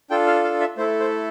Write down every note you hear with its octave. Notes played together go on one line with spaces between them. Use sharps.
D4 F4 A4 G5
F5
F5
E5
A3 E4 A4 C5
C5